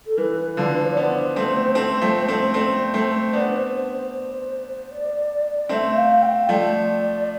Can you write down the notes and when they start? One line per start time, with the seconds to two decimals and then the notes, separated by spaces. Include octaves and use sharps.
0.06 A4
0.18 E3 B4
0.57 D3 F3
0.86 D5
0.96 B3 D4 C5
1.36 A3 C4
1.75 A3 C4
2.02 F3 A3
2.28 A3 C4
2.54 A3 C4 C5
2.94 A3 C4
3.33 B3 D4
4.91 D5
5.69 A3 C4 E5
5.97 F5
6.22 G5
6.49 F3 A3 D5